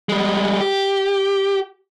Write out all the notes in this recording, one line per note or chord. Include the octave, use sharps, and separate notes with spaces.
G3 G#3
G4